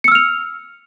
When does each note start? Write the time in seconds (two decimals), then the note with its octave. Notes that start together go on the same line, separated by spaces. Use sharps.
0.04 C#7
0.08 E6
0.12 F6
0.15 F7